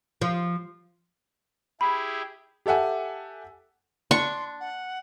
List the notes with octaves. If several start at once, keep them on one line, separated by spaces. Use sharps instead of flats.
F3
E4 G4 G#4 B5
G4 A4 E5 F#5 G#5
D4 C6 C#6
F#5